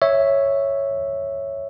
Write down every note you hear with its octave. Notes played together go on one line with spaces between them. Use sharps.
C#5 E5